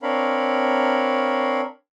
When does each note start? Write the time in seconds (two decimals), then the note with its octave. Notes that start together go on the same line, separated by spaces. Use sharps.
0.03 C4 D4 A#4 C#5 F5 B5